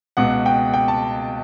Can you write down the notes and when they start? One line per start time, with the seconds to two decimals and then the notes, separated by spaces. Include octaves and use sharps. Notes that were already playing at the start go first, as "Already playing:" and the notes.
0.17 C#2 B2 F#5
0.46 G5
0.74 G5
0.88 A5